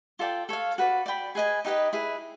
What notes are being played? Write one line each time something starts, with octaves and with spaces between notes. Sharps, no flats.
F4 A4 D5 G5
A4 C#5 F5
F#4 B4 D5
D5 G5 B5
G#4 B4 D#5 G#5
D#4 G4 B4 D#5
E4 G#4 B4